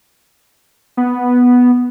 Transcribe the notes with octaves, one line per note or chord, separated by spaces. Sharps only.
B3